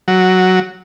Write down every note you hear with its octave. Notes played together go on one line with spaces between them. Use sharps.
F#3